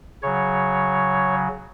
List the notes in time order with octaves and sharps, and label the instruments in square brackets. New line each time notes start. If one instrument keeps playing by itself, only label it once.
[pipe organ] C#3 F#3 C#5